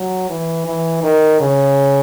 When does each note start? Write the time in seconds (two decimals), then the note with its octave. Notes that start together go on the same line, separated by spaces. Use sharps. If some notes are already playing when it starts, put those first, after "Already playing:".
Already playing: F#3
0.30 E3
0.67 E3
1.03 D#3
1.40 C#3